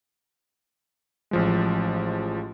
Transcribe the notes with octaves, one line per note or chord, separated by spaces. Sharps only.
A1 F3 G#3